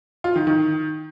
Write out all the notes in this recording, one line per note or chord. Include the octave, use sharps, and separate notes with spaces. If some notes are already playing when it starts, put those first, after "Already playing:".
F4
D#3
D#3